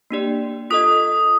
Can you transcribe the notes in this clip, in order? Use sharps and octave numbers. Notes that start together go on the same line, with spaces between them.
A#3 D4 G4 D5
F4 A4 D#5 D#6